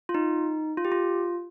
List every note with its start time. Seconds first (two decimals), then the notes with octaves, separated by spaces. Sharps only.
0.09 F4
0.15 D#4
0.77 F4
0.85 G4
0.92 F4